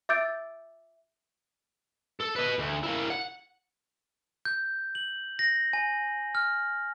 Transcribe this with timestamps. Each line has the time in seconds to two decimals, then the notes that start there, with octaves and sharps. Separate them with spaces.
0.09 E5 D6 E6 G6 A6 D7
2.21 A4
2.36 B4 D#5
2.59 D2
2.83 A#3 E4
3.10 F#5
4.45 G6
4.95 F#7
5.39 A#6
5.73 G#5
6.35 F6